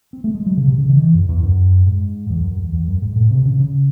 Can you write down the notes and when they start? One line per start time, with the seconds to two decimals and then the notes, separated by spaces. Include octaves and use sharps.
0.13 C4
0.24 A3
0.35 G#3
0.46 F#3
0.57 C#3
0.68 C3
0.78 C#3
0.89 D#3
1.00 E3
1.14 F#2
1.29 E2
1.43 F#2
1.87 G#2
2.30 E2
2.41 F#2
2.52 F#2
2.62 E2
2.73 E2
2.88 F#2
3.02 G#2
3.16 A2
3.31 C3
3.45 C#3
3.60 C#3